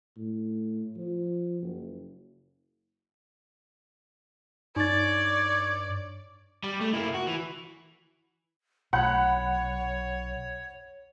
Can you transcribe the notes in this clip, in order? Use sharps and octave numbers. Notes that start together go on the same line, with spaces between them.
A2
F3
F#1
G2 D#4 C#5 D5 A6
G3
A3
A#3 E4
F#4
E3
B1 C#5 F#5 B5 F#6